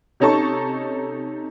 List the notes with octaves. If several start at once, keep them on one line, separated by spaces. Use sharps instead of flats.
C3 C#4 D#4 A4 A5 C#6